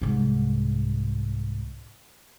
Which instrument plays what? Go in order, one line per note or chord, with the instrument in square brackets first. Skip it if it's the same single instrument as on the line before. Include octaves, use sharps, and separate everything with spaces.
[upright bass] C2 G#2